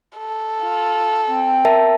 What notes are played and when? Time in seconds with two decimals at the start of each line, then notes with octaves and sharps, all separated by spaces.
0.18 A4
0.61 F4
1.28 C4 G5
1.65 A#4 E5 A5